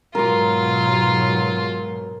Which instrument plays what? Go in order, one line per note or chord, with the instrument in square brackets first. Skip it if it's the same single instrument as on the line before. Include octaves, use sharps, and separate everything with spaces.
[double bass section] G#2 B2 F#3 [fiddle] F4 [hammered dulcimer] A#4 D6